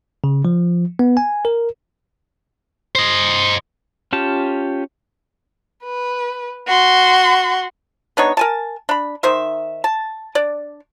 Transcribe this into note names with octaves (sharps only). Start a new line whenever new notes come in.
C#3
F3
B3
G#5
A#4
C5 D#5
C#4 F4 G4 A5
B4
F#4 C6
B3 D4 D#4 C#5
A#4 G#5 A5
D4 B5
D#3 D#4 C5 E5
A5
D4 D5